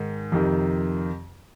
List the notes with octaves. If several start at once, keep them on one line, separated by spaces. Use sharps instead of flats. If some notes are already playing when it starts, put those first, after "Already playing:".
Already playing: G#2 D#3
F2 C3 D#3